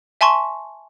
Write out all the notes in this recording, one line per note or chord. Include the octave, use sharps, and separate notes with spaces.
E5 G#5 A5 C6 C#6